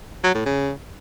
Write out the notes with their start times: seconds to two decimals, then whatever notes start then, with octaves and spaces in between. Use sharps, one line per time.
0.24 F#3
0.35 A2
0.46 C#3